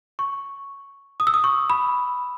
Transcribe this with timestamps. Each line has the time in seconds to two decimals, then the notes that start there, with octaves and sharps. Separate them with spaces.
0.19 C#6
1.20 D#6
1.27 E6
1.34 D#6
1.44 C#6
1.70 B5